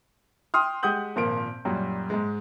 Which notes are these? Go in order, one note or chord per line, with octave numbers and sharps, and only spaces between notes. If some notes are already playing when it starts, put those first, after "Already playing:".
G5 C6 D#6 F6
G#3 G4 F#5 D#6 G6 F#7
G#1 A#2 F3 A#4 D7
F#2 A#2 F#3 G3
G#2 G#3